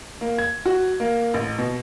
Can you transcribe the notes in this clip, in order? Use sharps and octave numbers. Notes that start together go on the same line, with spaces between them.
A#3
G#6
F#4
A#3
A1
B2